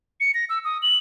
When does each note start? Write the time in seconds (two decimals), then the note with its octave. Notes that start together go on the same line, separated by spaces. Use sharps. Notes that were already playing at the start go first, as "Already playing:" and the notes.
0.20 C#7
0.34 A#6
0.50 E6
0.65 D#6
0.83 F#7